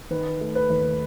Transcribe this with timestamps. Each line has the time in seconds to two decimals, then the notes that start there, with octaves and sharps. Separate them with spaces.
0.11 D#3 B4
0.41 A3
0.55 B4
0.70 D#2